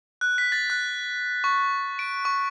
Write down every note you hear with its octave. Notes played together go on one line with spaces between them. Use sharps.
F#6
B6
A6
F#6
C#6
D7
C#6